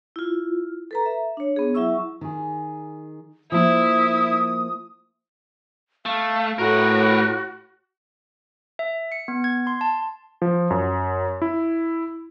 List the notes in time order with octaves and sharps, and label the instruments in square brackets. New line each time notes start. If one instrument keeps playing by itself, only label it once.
[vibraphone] E4 F4
A4 B4 A#5
E5
D4 C#5
B3 G#4
F#3 E4 E5 C#6 E6
[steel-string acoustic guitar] D#3 G#4
[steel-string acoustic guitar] F3 A#3 [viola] E4 [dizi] D#6
[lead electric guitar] A3 [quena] F5
[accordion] A2 [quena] F#4 [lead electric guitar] A#4 B4
[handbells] E5
C#7
B3
G#6
C6
A5
[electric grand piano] F3
F#2
E4